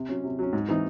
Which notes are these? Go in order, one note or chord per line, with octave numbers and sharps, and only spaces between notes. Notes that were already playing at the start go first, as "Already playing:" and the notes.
Already playing: C3
F#3 C#4
C3
F#3 C#4
G#2
E3 C4 D#4